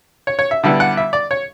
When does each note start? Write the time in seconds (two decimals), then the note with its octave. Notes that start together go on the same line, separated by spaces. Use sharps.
0.27 C#5
0.39 C#5
0.51 E5
0.63 D3 G3 B3 E4 E5
0.80 F#5
0.97 E5
1.13 D5
1.31 C#5